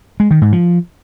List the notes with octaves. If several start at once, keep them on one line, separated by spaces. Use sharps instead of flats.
G#3
D#3
G#2
F3